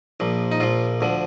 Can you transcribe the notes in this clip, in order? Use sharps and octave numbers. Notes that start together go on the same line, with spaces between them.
A#1 A#2 F3
D#4
A#1 A#2 F3 F4
D2 D3 F3